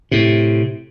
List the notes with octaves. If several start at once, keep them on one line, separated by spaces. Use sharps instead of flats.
A2 C3